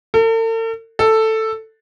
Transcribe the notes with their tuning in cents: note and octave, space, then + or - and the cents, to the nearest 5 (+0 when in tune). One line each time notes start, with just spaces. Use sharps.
A4 +45
A4 +5